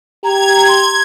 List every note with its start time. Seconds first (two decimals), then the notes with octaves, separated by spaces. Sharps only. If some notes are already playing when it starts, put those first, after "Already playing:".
0.24 G4 A#5 G#6
0.68 C6